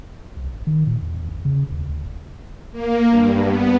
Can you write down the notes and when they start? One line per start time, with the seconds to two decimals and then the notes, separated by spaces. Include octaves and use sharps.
0.37 C2
0.54 A1
0.67 D#3
0.87 A#2
1.02 E2
1.16 E2
1.29 A1
1.45 C#3
1.71 D#2
1.89 D2
2.05 F#1
2.72 A#3
3.08 G2
3.45 B3